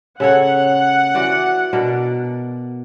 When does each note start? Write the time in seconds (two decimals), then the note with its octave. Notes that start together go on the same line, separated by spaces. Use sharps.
0.20 C#3 A4 C#5 F#5
1.15 E3 F#4 D5
1.73 B2 D4 A#4